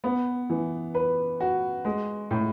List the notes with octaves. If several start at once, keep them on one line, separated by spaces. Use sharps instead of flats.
B3
E3
B4
F#4
G#3
A2